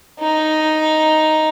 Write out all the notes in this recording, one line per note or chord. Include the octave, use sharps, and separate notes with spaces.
D#4